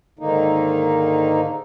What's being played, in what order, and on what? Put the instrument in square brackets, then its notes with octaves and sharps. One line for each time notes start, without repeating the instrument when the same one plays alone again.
[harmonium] G#2 D3 D#3 A#3 D#4